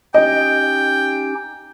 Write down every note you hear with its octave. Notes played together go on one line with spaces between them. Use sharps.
C#4 D#4 G4 D#5 G5